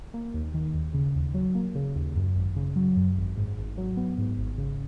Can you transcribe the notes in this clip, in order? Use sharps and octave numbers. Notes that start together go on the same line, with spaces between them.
A#3
D#2
D#3
D#2
C#3
D#2
F#3
A#3
C#3
D#2
F#2
G#1
C#3
F#3
F#2
G#1
G#2
G#1
F#3
B3
G#2
G#1
C#3